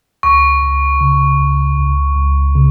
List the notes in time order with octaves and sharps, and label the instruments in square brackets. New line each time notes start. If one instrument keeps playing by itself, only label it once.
[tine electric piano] C#2 [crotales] C#6
[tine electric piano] C#2
C#3
C#2
C#2
C#2
C#3